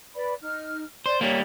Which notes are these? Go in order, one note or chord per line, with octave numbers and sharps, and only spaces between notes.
B4 D5 B5
D#4 F6
C5 D5
G3 A#3 C#5